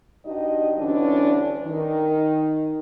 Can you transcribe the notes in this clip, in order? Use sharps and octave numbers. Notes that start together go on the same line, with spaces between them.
G2 D#4 F#4 D#5
D2 G2 D3 E3 C#4 D4
D#3